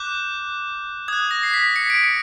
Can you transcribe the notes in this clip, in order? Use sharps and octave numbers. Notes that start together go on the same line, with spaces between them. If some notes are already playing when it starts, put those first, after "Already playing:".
Already playing: D6 F#6 G6
D#6 F#6 G#6
A#6
C7
B6
C#7
D7
C#7